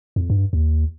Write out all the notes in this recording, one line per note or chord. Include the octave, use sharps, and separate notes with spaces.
F2
G2
D#2